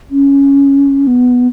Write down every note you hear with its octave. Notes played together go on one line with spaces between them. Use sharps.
C#4
B3